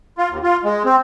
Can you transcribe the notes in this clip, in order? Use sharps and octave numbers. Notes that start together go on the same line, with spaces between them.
F4
D#2
F4
G#3
C4